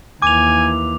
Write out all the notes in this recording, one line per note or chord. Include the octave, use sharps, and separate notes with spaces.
D#2 E3 G#5 D6 F7